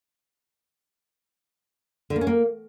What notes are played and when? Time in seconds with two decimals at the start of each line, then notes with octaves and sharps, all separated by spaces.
2.10 D3
2.16 A#3
2.21 C#4
2.27 A#3